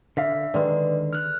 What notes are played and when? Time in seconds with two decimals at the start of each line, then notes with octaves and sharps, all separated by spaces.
0.17 D3 E5 F5 B6
0.54 D3 D#3 G#3 B4 D5
1.13 F6 F#6